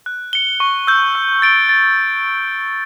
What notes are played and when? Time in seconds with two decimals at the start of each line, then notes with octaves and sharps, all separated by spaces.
0.06 F#6
0.33 C#7 G7
0.60 C#6
0.87 E6 G6
1.15 E6
1.42 A6 D7 G7
1.69 A6